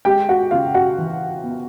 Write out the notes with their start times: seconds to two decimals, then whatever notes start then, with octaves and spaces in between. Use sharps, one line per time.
0.05 G#3 G4 G5
0.29 F#4 F#5
0.51 C#3 F4 F5
0.74 F#4 F#5
0.98 E3
1.43 B3